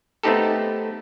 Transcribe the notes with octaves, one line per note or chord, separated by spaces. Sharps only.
A3 B3 C4 D#4 G4 A4